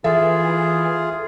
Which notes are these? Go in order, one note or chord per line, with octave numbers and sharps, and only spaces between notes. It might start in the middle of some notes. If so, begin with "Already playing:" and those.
E3 F4 G#4 A4 E5